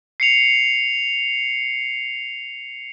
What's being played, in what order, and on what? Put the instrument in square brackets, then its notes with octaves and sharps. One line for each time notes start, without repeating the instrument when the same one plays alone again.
[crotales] C7 C#7 F7